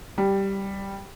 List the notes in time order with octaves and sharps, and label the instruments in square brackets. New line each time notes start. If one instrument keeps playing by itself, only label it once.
[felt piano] G3